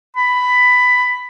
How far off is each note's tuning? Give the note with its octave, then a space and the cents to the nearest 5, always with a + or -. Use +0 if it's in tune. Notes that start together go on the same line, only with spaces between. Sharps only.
B5 +10